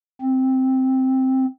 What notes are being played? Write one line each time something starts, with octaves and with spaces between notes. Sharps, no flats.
C4